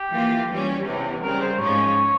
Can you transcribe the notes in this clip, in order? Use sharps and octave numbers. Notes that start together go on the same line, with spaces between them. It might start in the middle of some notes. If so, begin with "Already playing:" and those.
Already playing: G4
E3 A#3 F4
E3 G3 C#4
E2 C3 E3
C#3 G3 C4 A#4
C5
G#2 F3 G#3 C#4 C#5